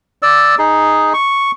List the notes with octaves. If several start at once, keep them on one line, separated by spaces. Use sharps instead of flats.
D5 E6
D#4 G#4
C#6